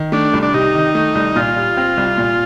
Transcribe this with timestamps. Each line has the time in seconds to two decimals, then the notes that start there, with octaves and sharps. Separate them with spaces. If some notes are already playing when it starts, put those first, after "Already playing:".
Already playing: D#3
0.12 A3 D4
0.33 C2
0.43 D4
0.54 C3 D#4
0.75 D#3
0.95 A3
1.15 C2
1.36 A#2 F4
1.56 G3
1.77 C4
1.97 C2
2.18 A#2